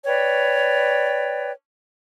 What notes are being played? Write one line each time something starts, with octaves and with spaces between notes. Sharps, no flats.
B4 C#5 D5 G5